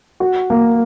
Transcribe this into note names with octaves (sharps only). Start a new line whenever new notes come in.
F#4
A#3